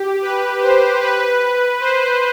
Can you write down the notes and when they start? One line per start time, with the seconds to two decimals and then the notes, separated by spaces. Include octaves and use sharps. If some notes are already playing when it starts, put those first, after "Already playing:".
Already playing: G4
0.22 B4
0.61 C5
1.01 B4
1.80 C5